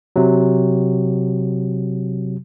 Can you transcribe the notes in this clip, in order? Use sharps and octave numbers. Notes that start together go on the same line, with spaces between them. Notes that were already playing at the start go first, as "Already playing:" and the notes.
C3 F#3